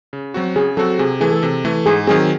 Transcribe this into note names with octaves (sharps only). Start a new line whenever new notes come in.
C#3
F#3 C4 F#4
C#3 G#4
F#3 C4 F#4 A4
C3 G#4
E3 A3 G#4
A4
C3
E3 A3
G#2 G#4
D#3 F#3 C4 G#4